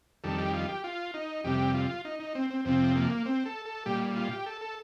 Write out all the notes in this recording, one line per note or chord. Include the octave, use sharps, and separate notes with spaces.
F2 D#3 G3 A4
G4
F4
G4
F4
D#4
F2 C3 G3 G4
F4
D#4
D#4
C4
C4
F2 C3 F3 C4
A#3
C4
A4
A4
A#2 G3 G4
F4
G4
A4
A4